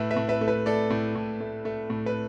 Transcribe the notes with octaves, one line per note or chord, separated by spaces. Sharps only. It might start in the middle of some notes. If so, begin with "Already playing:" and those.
Already playing: A2 B4 E5
B4 E5
A2
B4 E5
A3
B4
A3 A4 D5
A2
A2
A3
A3
A2
B4